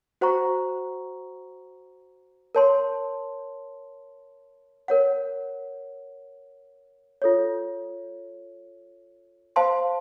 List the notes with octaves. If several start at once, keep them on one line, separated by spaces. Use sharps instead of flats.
F#4 C5 F#5 A#5 C#6
A#4 C#5 A5 C6
A#4 C#5 F#5
F4 A4 C#5
C5 F5 A5 C6